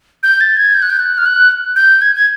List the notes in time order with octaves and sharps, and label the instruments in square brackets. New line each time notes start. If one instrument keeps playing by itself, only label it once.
[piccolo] G6
A6
G#6
G6
F#6
G6
F#6
F6
F#6
G6
G#6
G#6